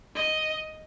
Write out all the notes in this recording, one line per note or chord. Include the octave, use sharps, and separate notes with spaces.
D#5